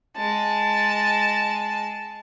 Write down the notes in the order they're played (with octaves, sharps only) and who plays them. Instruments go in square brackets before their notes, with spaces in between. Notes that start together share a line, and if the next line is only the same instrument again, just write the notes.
[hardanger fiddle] G#3 A5